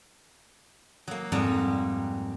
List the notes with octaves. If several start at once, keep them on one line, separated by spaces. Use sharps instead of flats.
F#3 A#3
F2 G#2 G3 A#5